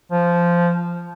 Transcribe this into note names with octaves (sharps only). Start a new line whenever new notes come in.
F3